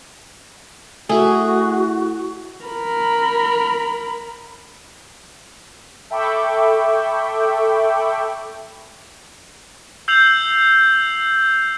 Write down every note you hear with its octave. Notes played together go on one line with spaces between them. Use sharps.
A3 E4 F#4 G#4
A#4 B5
A4 E5 G5 B5 C#6 D6
E6 G6 C7 F7 F#7